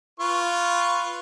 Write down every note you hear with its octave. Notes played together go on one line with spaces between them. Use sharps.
F4 B4 C#6